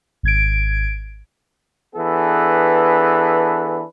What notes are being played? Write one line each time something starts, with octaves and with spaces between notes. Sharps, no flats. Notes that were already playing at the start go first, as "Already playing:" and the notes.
G#1 G#6 D7
E3 B3 D4 G#4 A4 B4